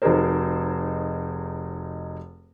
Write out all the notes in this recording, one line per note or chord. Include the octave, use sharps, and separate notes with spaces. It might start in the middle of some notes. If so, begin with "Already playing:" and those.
F1 D#4 F#4 G#4 A#4 C5